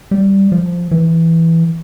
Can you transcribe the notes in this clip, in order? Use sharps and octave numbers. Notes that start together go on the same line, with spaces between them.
G3
F3
E3